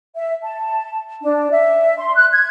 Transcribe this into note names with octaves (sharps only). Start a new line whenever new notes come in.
E5
A5
D4
E5
C6
F#6
G#6